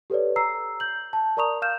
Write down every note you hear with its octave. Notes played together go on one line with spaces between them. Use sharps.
G4 A4 B4 C#5 D5
A#5 E6 C7
G6 F#7
A5
A#4 D5 A#5 C#6 D#6 F7
F5 F6 G6 E7